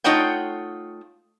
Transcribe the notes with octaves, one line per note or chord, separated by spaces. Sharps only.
A3 D#4 F4 C#5 F#5 G5